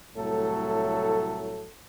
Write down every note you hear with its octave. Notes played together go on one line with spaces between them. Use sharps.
C2 A2 F#3 A3 A4